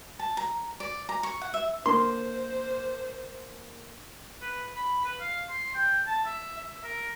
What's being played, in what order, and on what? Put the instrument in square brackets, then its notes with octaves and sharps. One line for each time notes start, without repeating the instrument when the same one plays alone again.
[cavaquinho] A5
A#5
D5
A#5
C#6
F#5
E5
[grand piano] D3 A#3 [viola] C5 [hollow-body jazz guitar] C6
[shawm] B4
B5
B4
F5
C6
G5
A5
E5
E5
A#4